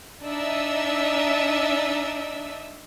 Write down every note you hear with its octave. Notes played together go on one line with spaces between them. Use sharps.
D4 D#4 D#5 E5 E6